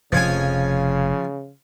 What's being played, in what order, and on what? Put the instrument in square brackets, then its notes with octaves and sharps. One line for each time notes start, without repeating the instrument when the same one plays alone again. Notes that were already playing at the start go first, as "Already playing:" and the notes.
[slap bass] F1 F2 [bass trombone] C#3 [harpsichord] F3 C#5 G#5